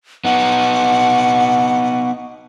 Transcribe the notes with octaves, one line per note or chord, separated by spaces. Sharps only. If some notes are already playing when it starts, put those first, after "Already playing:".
B3 D#4 F#5